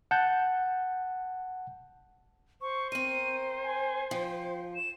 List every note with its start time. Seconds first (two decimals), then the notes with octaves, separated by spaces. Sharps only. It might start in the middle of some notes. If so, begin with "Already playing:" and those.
0.11 F#5 A5 G6
2.61 C5 C#6
2.92 C4 A#4 D#7
3.64 G#5
4.11 F3 G5
4.74 E7